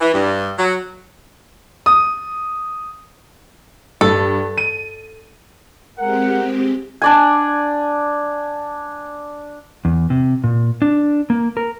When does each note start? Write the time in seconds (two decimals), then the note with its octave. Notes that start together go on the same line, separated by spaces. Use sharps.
0.01 E3
0.13 G2
0.58 F#3
1.86 D#6
4.01 G2 A4
4.58 D#7
5.99 G#3 C4 G4 A#4 F#5
7.02 D4 D5 G#5
9.85 E2
10.10 C3
10.44 A#2
10.82 D4
11.30 A#3
11.57 A#4